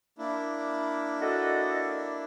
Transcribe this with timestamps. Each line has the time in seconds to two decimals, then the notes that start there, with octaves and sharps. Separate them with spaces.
0.18 A#3 D4 E4
1.21 F#4 A4 D#5